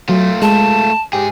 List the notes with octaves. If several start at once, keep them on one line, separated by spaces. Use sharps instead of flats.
F#3 A3 F4
G#3 A5
G#2 G4 G#4